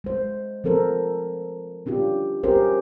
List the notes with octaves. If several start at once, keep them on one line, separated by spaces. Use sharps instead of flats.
G#3 C5
F3 C4 A4 A#4 C5
C#4 D4 F4 G4
C#4 G4 G#4 A#4 C5